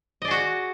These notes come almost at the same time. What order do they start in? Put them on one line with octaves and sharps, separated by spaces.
D#5 D5 G#4 F#4